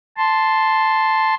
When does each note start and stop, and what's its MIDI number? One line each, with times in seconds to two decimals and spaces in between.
0.17 1.35 81
0.17 1.35 84